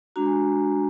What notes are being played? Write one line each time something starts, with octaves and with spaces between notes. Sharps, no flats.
G#3 D4 F#4 A#5
G#5